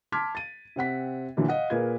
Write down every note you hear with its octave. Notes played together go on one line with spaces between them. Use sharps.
A5 C6 D6 F6 G#6 B6
A6 D#7
C3 C4 F#5 B6
A#2 D3 E3 F#3
D#5 F5 F#5
A#2 G#4 A#4 B4 F5 G#6